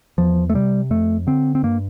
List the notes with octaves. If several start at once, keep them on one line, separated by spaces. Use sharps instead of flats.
E2 F3
A3
C3 G3
F2 A3
D3 C4
C4
G2 A#3